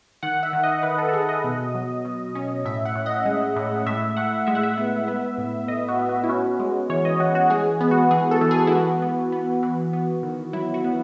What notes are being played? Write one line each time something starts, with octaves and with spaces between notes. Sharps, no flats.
D#3 F#5
E5
D#3
D#5
D#3 B4
A4
A4
D#3 G#4
D#5
B2
F#3
B2
C#4
A2 E5
F#5
A2
D#5
G#3
A2
A2 E5
A2 F#5
G#3 E5
F#5
E5
B3
B3
A2
A2 D#5
F#4
B3
F#4
E4
C#4 F#4
G#3
E3 C#5
D#5
E3 F#4
F#4
G#3 G#4
B3
F#4
E3 G#4
A4
E3
G#4
E4
B3 F#4
B3
B3
E3
B3
D#3
F#3 E4
F#4
B3